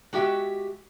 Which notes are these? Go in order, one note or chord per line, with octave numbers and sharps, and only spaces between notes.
G#3 F#4 G4 E5